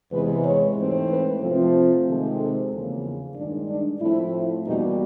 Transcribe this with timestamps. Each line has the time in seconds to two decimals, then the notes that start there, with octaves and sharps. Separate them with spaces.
0.11 E2 C3 E3 G#3 B3 B4
0.44 C#5
0.77 G#2 E3 A3 C4
1.10 B4
1.41 C3 F3 A3 C4
2.06 C3 D#3 G#3 C4 A4
2.39 A4
2.72 E2 C#3 F3 A#3
3.36 G2 D#3 G#3 D4
3.69 D4
4.01 A2 F3 A3 C4 E4
4.66 E2 B2 G3 A#3 D#4